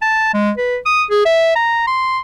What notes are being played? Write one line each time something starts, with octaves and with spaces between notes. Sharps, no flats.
A5
G#3
B4
D#6
G#4
E5
A#5
C6